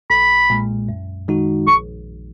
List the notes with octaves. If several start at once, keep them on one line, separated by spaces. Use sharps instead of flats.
B1 B5
A#2 G#3
F#2
D#3 G#3 D#4 F#4
A#1 C#6